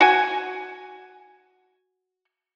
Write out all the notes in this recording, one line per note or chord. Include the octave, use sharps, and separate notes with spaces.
F#4 G#5